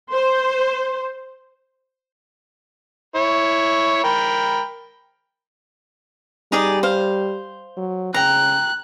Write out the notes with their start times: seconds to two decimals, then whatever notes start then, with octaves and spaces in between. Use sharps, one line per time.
0.13 C5
3.15 E4 C#5
4.04 A#4 G5 B5
6.52 G3 D#4 G#4 D5
6.83 C5 F5
7.77 F#3
8.14 C#3 G5 A#5 F#6